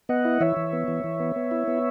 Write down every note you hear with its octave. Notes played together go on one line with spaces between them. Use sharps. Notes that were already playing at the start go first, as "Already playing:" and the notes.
B3 D#5 F#5
E4
E3 C#5 E5
E3
B3
E3
E3
B3
B3
E4
B3